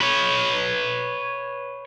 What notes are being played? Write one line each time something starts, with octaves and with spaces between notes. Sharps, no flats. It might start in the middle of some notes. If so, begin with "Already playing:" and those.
B4 C#5